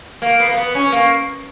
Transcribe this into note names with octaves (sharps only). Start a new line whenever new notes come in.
A#3
B3
A#3
B3
C#4
A#3